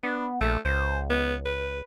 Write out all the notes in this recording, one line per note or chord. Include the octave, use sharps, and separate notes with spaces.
B3 D4
A#1 A3
C#2 C5
B3
B4